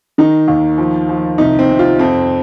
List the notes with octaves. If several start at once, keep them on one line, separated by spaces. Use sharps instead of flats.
D#3 D#4
D#2
F3
F3
C2 D#4
C4
C3
F4
F2 C4